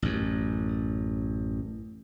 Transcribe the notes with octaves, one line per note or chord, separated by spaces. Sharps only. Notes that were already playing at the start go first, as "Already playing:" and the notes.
A1 F#2